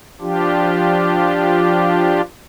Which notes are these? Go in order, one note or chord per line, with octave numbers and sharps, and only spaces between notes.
F3 D4 F4 G4